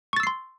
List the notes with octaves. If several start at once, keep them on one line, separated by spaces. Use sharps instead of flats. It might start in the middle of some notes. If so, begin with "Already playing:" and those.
C6 C#6 E6 A6 C7